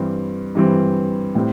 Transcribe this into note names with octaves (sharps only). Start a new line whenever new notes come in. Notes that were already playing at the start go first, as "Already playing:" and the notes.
Already playing: G2 E3 G3 C4
G2 E3 G3 C4
A2 G3 C4